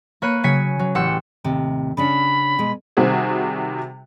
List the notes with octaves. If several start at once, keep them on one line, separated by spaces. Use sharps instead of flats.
A#3 C#5 B5 F#6 C7 D#7
C#3 F#3 G#5 G#6 B6 C#7
F#3
A1 G4 F#5 C6 E6 C#7
D#2 A2 C3
C#3 C#4 D4 B5
B2 G#3 B4
C3 D#3 G3 C4 F#4 G#4